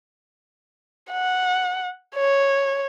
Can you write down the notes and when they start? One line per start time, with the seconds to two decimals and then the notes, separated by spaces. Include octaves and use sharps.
1.12 F#5
2.16 C#5